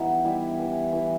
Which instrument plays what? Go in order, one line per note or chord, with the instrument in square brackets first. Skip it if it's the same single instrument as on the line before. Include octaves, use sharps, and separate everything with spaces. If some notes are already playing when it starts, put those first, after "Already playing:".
Already playing: [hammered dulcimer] E3 G3 B3 D#4
G3 E4
E3
E3